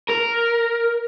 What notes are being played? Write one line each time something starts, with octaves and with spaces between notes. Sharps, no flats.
A#4